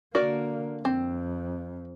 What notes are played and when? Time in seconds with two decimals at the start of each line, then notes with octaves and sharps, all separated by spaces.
0.15 D3 A#3 F#4 A#4 D5
0.85 F2 C4